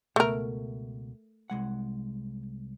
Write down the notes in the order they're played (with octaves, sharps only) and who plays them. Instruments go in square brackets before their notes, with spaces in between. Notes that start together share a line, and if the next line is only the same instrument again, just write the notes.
[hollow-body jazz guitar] C#2 B2 [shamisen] A3 A#4
[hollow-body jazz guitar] C2 G#3 F#5